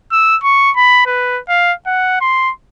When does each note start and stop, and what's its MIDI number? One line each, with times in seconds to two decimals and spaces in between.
0.12 0.37 88
0.43 0.71 85
0.76 1.04 83
1.06 1.40 71
1.49 1.73 77
1.86 2.19 78
2.21 2.51 84